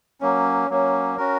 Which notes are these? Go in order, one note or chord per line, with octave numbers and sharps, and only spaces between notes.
F#3 A#3 C#4
F#3 A#3 C#4
C#4 F#4 A#4